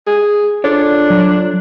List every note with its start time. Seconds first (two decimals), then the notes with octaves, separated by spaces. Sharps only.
0.07 G#4
0.64 D4 F4 A4 C#5
1.10 F#3